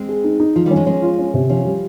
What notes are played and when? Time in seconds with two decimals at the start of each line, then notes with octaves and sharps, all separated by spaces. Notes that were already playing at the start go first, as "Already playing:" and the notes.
Already playing: G#3 C4
0.09 G#4
0.24 D#4
0.40 D#4
0.55 F3 F4
0.66 D#3 G3
0.71 C#4
0.76 F3 G#3
0.86 F3 G#3 C#4
1.02 F4
1.18 C#4
1.34 C3
1.49 F3 C#4
1.65 G3